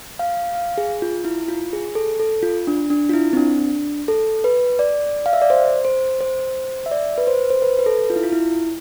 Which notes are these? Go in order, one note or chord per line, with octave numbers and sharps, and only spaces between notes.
F5
F5
G#4
F4
E4
F4
G#4
A4
A4
F4
D4
D4
F4
E4
C4
D4
A4
B4
D5
F5
E5
D5
C5
C5
C5
E5
D5
B4
C5
C5
B4
B4
A4
F4
E4
F4
E4